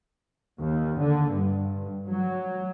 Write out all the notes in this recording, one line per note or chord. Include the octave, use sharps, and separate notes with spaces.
D#2
D3
G2
F#3